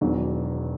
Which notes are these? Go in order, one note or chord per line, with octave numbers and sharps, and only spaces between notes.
E1 E2 D#3 F#3